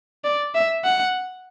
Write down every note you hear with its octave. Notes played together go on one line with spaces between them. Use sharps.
D5
E5
F#5